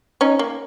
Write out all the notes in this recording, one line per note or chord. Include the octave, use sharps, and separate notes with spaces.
C#4 D#4
A#3